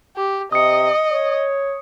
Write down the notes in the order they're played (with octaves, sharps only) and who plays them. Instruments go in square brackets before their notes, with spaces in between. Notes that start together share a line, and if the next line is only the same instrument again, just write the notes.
[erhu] G4
[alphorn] C3 [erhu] D#5 [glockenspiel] D#6 C#7
[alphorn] C#5